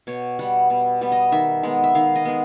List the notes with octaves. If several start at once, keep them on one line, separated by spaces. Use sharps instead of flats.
B2 C#5
G3 B3 F#5
B2
G3 B3
D#5
D#3 E5
G#3 B3
E5
D#3 F5
D#5
G#3 B3